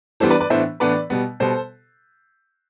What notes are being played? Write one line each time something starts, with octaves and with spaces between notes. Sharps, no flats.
E3 G3 B3 D4 A4 C5
B4 D5
B4 D5
A2 E3 B3 D4 C5 E5
A2 E3 B3 D4 B4 D5
B2 G3 B3
B2 G3 B3 A4 C5